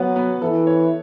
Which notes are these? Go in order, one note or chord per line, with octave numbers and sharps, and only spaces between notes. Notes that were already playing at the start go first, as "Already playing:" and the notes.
Already playing: F#3 B3 B4
B3
E3 A4
C#5